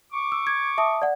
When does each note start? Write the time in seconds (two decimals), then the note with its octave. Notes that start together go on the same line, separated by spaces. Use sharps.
0.13 C#6 D6
0.32 E6
0.47 G#6
0.78 E5 A5 D#6
1.02 D5 F#5